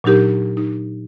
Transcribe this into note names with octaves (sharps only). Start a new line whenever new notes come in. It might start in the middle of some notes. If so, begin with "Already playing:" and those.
A#2 F#3 D4 D#4 G4 A#4
D#4